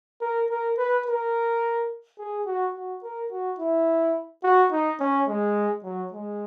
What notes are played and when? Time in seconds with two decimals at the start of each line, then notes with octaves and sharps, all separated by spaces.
0.21 A#4
0.50 A#4
0.78 B4
1.06 A#4
2.19 G#4
2.46 F#4
2.74 F#4
3.03 A#4
3.31 F#4
3.59 E4
4.43 F#4
4.72 D#4
5.00 C#4
5.28 G#3
5.83 F#3
6.12 G#3